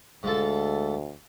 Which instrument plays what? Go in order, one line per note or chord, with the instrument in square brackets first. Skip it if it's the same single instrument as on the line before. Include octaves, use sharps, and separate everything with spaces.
[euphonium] D2 [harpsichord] G#2 F4 A4